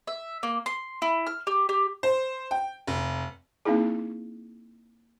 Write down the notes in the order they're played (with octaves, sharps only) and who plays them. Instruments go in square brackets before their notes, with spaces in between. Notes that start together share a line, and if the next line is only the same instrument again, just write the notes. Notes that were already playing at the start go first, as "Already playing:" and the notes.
[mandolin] E5
A#3
C6
E4
F6
G4
G4
[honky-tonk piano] C5
G5
F1
[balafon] A#3 C4 D#4 E4 G#4